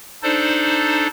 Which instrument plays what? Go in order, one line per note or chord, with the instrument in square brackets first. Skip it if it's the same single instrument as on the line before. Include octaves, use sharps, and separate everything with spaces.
[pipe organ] D4 D#4 A4 C5 D5